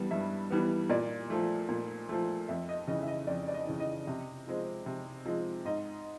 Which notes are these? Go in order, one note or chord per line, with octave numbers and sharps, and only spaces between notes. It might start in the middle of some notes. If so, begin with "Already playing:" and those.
Already playing: G2 E3 G3 B3
G2 E5
E3 G3 B3
A#2 D5
F3 A3
A#2
F3 A3
F2 E5
D#5
C#3 E3 D#5
E5
D#5
F2 D5
D5
D#5
C#3 E3
D#5
C3
F3 G#3 C4
C3
F3 G#3 C4
G#2 D#5